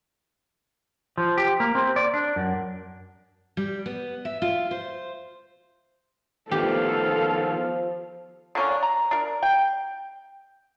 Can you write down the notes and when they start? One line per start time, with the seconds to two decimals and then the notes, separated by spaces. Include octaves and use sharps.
1.18 F3
1.38 G4
1.60 A#3
1.75 C4
1.96 D5
2.14 D4
2.36 F#2
3.57 G3
3.86 B3
4.25 E5
4.42 F4
4.71 C5
6.51 D#3 F3 B3 G4 A4 F5
8.55 D3 A#3 C#4 D4
8.83 A#5
9.11 D4 A#4
9.43 G5